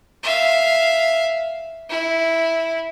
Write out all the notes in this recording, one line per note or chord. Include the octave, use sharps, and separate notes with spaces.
E5 F5
E4